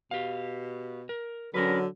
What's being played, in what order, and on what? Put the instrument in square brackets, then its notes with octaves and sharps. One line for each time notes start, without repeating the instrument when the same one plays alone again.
[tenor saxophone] B2 [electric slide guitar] G4 F5
[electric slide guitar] A#4
[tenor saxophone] D3 [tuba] F#3 [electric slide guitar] C#4 D4 B4 [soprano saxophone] A#4